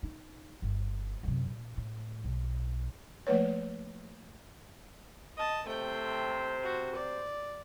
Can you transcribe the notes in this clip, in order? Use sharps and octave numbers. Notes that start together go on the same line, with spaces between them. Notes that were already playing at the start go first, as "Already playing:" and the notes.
D#4
G1
F#2 C3
A#2
A2
B1
F3 A3 A#3 B4 C#5
D#5 A5
C3 A3 C5 G5
F#4
D5